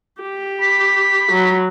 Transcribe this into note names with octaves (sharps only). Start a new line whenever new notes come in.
G4
B5
F#3